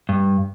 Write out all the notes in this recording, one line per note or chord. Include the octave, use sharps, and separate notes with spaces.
G2